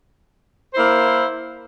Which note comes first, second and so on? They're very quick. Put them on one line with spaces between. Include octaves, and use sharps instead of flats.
C5 E4 A#3